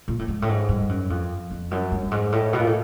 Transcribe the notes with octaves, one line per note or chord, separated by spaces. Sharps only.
A#2
A2
G#2
A2
G#2
G2
F#2
F2
F2
F#2
G2
G#2
A2
B2
A#2
A2